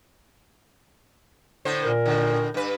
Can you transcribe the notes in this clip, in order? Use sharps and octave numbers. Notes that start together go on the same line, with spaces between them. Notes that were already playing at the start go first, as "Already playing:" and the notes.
A2 D3 C5
A#2 A#4
A2 D3
G2 B4